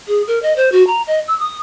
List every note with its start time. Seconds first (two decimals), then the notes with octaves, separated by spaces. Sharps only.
0.08 G#4
0.27 A#4
0.42 D#5
0.56 C5
0.72 F#4
0.87 A#5
1.07 D#5
1.28 E6
1.39 D#6